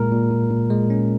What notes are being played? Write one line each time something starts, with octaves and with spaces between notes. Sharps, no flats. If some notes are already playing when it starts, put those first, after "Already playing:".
Already playing: A#2 G#3 A#4
A#2
A#2
A#2
G#3
C#4